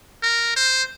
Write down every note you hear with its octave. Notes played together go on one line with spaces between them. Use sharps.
A#4
C5